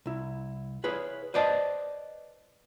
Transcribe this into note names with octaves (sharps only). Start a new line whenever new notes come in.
C2 E4
E4 G#4 B4 C#5
B4 C5 D5 D#5 A5